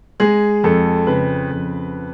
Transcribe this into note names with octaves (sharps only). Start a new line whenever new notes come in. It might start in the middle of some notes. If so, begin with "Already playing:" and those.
G#3 G#4
F2 A4
C#3 B4
F2